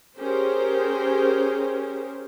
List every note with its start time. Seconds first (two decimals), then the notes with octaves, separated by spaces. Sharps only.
0.17 C#4 G4 G#4 A#4 C5